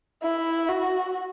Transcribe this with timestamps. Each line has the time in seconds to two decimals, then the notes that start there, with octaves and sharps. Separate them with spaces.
0.23 E4
0.69 F#4